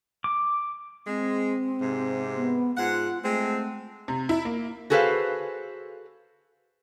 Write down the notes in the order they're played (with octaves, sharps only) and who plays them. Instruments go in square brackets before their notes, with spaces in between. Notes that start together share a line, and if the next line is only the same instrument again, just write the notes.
[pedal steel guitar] D6
[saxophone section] G#3 [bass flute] C4
[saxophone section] G#2 C3
[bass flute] B3
[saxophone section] G#2 F#5 [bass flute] F4
[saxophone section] G#3 C4 [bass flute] A3
[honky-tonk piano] C3
E4
A#3
[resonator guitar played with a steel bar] F#4 G#4 A4 B4 C5 F5